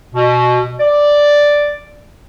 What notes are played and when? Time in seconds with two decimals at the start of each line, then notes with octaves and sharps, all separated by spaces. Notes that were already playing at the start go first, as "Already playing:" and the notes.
0.15 B2
0.80 D5